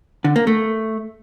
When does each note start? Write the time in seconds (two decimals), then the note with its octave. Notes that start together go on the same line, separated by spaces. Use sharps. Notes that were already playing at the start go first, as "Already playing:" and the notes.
0.24 D3
0.36 A#3
0.47 A3